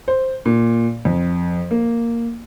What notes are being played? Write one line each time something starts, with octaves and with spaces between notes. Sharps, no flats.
C5
A#2
F2
A#3